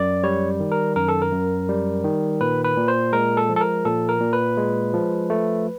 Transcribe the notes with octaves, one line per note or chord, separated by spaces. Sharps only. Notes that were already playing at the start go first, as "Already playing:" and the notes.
Already playing: F#2 D5
G3 C#5
D#3
A#4
F#2 A#4
A4
A#4
F#2
G3
D#3
A#2 B4
B4
A#2
C5
G#3 A#4
A4
F3
A4
A#4
A#2 A4
A#4
A#2
B4
G#3
F3
A3